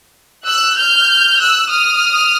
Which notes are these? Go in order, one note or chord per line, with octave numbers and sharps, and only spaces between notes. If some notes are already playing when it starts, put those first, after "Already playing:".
E6 F#6
F6 G6
E6 F#6
D#6 F6